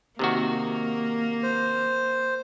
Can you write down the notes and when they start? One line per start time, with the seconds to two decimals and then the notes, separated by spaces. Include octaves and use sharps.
0.19 C3 D#3 A#3 F#4
1.43 C5